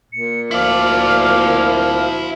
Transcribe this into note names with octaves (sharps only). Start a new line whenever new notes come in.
A#2 C#7
D2 F3 E4 D5 F5